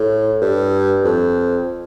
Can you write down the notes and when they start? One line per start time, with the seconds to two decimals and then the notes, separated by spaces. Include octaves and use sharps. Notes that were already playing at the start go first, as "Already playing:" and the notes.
Already playing: A2
0.42 G2
1.04 F2